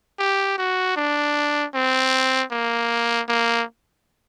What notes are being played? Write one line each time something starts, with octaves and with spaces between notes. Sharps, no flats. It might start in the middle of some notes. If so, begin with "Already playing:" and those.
G4
F#4
D4
C4
A#3
A#3